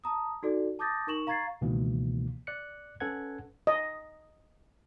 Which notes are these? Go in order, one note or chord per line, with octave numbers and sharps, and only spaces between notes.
A5 A#5 D#6
D#4 F#4 A4 D5
A5 D6 D#6 G6 A6 A#6
D#4 A#4 C#6 E7 F#7
F5 A#5 C#6 G#6 A6 C7
C#2 B2 D#3 E3 A#3
D5 F#6 C#7
C#4 A4 B4 F#5 G#6
D#5